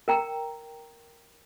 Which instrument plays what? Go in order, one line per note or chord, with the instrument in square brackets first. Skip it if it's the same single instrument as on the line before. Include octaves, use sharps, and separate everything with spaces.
[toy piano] A#4 G5 A#5